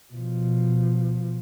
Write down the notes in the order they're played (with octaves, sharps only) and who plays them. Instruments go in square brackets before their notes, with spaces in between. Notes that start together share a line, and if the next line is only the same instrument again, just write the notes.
[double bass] B2 F3